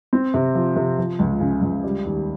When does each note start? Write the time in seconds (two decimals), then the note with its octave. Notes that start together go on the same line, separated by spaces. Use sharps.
0.13 C4
0.34 C3
0.55 F3
0.76 C3
0.98 F3
1.19 C#2
1.40 C#3
1.62 C#2
1.84 G3
2.05 D#2